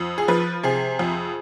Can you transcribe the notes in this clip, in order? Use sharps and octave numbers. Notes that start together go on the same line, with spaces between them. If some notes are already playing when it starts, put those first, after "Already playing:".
Already playing: F2
G#4
F3 B4
C3 G#4
F2